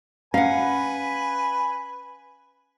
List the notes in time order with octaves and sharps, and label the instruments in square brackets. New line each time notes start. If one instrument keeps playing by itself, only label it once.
[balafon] C#4 [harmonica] B4 G#5 B5 [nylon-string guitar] F5 F#5